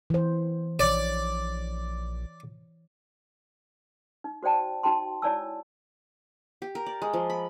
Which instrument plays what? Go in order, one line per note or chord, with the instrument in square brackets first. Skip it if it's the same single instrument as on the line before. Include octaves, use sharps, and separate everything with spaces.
[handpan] E3 C5
[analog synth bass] A#1 [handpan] C#5 [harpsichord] D5
[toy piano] D#4
F#4 C5 D5 G5 A5
D#4 F#4 G5 A5 C6
E4 C#5 D5 G#5 A5 E6
[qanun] G4
A#4
D5
G#3
F3
B5